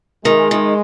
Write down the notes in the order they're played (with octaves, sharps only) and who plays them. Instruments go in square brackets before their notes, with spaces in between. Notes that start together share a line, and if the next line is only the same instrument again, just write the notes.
[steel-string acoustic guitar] D#3 [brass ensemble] G#3
[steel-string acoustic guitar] D#3